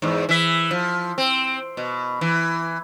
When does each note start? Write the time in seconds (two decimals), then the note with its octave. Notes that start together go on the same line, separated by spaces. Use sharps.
0.02 E2 G#2
0.29 E3 E5
0.71 F3
1.18 C4
1.77 B2
2.21 E3